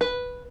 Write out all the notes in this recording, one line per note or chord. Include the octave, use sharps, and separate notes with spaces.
B4